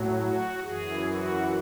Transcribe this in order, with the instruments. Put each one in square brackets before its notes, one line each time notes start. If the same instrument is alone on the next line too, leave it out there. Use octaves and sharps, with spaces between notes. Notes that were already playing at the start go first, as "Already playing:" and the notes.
Already playing: [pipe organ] A2 F#3
F#4
F#2 E3 G#4
F#4